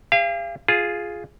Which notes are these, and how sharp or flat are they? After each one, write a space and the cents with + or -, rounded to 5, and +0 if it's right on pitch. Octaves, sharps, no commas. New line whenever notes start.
G4 +45 F5 -35
F4 +0 G#4 +0